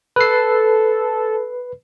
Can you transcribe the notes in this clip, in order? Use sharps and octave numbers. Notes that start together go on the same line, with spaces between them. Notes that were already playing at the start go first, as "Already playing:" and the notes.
A4 B4 C7